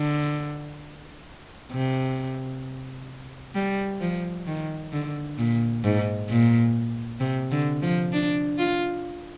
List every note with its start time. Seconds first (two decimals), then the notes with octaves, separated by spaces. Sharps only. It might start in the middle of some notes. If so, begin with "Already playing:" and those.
Already playing: D3
1.72 C3
3.55 G3
4.00 F3
4.46 D#3
4.93 D3
5.38 A#2
5.84 G#2
6.29 A#2
7.20 C3
7.51 D3
7.82 F3
8.13 D4
8.58 F4